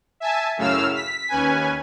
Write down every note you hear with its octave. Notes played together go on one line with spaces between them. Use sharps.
E5 G#5 A5
F#2 A2 C#3 F5 E6 F6
B6
D#2 C#4 B4 G#5